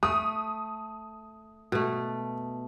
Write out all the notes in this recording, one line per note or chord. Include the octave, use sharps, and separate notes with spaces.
A3 D#6
B2 A3